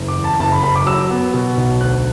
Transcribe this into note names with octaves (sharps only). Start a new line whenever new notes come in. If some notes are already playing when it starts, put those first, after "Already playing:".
Already playing: F#1
D6
E2
A5
F#1 A5
B5
F#1 B5
D6
F#3 E6
B3
B2
B1
D2 F#6